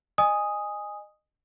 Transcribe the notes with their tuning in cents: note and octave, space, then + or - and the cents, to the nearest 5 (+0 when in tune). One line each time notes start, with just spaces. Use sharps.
D#5 -25 G#5 -10 D#6 +0